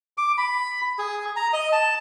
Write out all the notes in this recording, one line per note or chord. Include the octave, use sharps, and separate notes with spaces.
D6
B5
G#4
A#5
D#5
A5